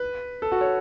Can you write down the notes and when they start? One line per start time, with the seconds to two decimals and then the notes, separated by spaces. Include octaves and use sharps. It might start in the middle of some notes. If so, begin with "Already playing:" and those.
Already playing: B4
0.42 A4
0.52 F#4
0.61 C#5